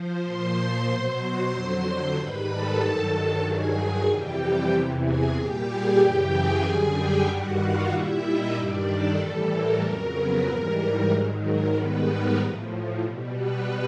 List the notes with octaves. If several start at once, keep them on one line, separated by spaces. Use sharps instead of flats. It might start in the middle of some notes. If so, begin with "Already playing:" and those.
Already playing: F3 C5
A#2 F3 C5 C6
B2 F#3 C5 C6
F2 D3 F#3
G#2 D#3 G3 B4 B5
A4 A5
G2 D#3 F#3
G2 D#3 F#3 G#4 G#5
F2 C3 E3 G3 G4 G5
E2 C3 E3
G#4 G#5
A#2 G3 G4 G5
G#4 G#5
F#2 C#3 E3 G4 G5
G#4 G#5
F#2 D3 G3
G4 G5
G2 D#3 G3 F#4 F#5
F4 F5
A#2 G3 E4 E5
D#4 D#5
G2 D#3 G3 D4 D5
A4
A2 E3 G3
A#4
F2 C#3 F#3
B3 B4
G#2 E3 G3 A#4
G#2 D#3 F#3
A#4
G#2 D#3 G3 B3 B4
A#4
A2 F3
B2 G3
B3 B4